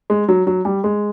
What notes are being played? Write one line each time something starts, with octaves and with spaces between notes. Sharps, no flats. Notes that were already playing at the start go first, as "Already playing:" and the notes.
G#3
F#3
F#3
G3
G#3